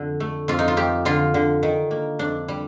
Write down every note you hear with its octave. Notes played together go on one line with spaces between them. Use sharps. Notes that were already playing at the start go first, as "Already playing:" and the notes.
Already playing: F2 D3
A3
F2 F4
D#4
F4
F2 G4
D3 F4
D3
D#3
A#3
F2 D4
G3